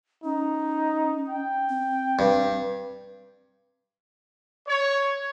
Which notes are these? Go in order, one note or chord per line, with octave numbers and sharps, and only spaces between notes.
C#4 D#4
G5
C4
G2
C#5